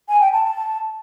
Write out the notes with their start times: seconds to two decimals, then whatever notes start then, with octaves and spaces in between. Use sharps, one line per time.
0.09 G#5
0.21 G5
0.32 A5
0.44 A5